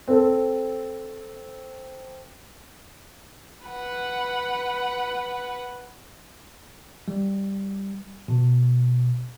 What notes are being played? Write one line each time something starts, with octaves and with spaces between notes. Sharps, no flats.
C4 A4
B4 F#5
G3
B2